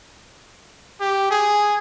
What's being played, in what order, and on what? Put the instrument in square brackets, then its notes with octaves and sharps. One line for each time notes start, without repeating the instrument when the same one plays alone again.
[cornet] G4
G#4